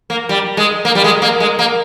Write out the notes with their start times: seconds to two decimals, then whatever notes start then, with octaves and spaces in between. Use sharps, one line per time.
0.10 A#3
0.29 G3
0.57 G#3
0.85 A#3
0.95 G3
1.04 G#3
1.22 A#3
1.40 G#3
1.59 A#3